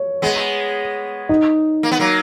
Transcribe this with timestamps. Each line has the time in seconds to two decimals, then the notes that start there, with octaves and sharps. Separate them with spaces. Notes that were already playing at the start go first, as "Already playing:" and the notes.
Already playing: C#5
0.22 G#3 B3
1.29 D#4 D#5
1.83 A#3
1.92 B3
2.00 F#3 A#3